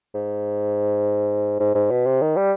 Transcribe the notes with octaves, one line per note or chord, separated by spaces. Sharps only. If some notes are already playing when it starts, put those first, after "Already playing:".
G#2
G#2
G#2
B2
C3
D#3
G3